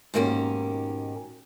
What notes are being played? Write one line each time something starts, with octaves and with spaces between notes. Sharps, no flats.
G#2 B2 D#3 A#3 C#4 G4